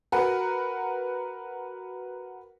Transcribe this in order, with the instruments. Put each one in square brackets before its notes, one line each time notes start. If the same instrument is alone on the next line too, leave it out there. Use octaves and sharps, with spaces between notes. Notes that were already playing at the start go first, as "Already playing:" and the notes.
[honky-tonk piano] F#4 A#4 B4 F#5